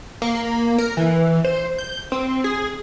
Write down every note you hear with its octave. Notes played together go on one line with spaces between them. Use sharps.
A#3
A#4
E3
C5
G6
C4
G#4